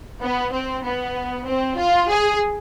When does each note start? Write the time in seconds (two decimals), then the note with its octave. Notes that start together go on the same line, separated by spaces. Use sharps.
0.20 B3
0.51 C4
0.83 B3
1.46 C4
1.77 F4
2.08 G#4